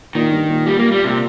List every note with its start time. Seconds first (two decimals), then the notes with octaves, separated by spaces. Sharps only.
0.15 A#2 D#3
0.32 G2
0.49 A#2
0.66 G3
0.79 A#3
0.92 G3
1.04 C3